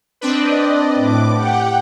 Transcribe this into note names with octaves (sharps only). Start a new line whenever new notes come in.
C4 D4 B4 D5 D#5
A2 D6
G4 F#5 G5